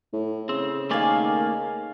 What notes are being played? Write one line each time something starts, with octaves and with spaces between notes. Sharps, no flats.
A2
C#3 C4
D#3 A3 A#3 D5 F5 G#5